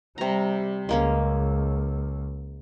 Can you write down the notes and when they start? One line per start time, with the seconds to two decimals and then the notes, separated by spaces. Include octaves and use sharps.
0.18 C3 G3 A#5
0.89 C#2 G#3 A#3 C#4